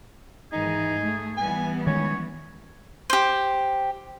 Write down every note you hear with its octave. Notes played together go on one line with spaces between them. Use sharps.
G#2 D#3 E3 D#4 G#4
A3
E3 G3 B3 G#5
D#3 G#3 C#4 C#5
G4 C5